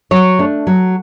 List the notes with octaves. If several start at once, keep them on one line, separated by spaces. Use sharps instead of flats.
F#3 C#5
A3 D4
F#3